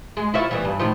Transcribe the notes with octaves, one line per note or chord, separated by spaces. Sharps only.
G#3
E4 F4 C#5
E3 G3 B3
G2
A2 D#3 F3